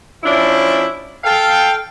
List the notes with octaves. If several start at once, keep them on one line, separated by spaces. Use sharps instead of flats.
F3 C#4 D4 E4
A4 F5 G5